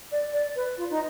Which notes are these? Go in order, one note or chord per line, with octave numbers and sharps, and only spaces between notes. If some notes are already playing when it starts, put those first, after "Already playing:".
D5
D5
B4
F4
D#4